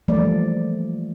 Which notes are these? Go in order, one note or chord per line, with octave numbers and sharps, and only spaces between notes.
E3 F3 G3 A3 A#3 D5